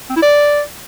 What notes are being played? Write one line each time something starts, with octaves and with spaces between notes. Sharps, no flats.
C4
E4
D5